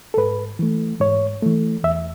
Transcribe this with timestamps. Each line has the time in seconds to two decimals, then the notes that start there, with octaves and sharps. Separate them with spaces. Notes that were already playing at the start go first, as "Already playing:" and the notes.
0.14 A4
0.17 G#2 B4
0.59 E3 A3
1.01 G#2 C#5
1.42 E3 A3
1.84 E2 E5